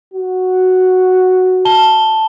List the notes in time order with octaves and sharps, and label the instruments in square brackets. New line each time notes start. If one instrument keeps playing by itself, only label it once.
[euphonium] F#4
[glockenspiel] A5 G7